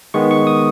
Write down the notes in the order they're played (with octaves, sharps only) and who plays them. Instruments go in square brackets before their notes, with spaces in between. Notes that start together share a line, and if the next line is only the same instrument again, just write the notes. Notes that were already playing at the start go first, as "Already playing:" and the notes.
[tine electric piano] D#3 G#3 B3 C#6
C#6
D#6